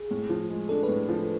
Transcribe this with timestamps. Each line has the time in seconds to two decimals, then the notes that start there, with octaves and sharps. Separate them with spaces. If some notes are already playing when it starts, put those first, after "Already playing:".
Already playing: G#4
0.11 A2
0.29 F3
0.50 G#3
0.69 D4 A4
0.83 B4
0.88 A2
1.09 F3